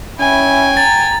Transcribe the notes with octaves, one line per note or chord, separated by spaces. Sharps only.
C#4 E4 G5 G#5
A#5 A6